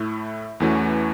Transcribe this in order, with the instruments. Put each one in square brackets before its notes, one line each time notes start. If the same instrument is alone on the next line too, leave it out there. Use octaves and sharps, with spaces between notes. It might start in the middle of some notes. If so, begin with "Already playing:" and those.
Already playing: [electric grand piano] A2 A3 E4
E2 E3 A3 C#4 F#4